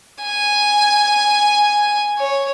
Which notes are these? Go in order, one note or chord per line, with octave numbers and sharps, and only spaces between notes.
G#5
C#5